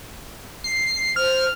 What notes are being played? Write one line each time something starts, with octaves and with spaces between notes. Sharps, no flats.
C7
C5 F6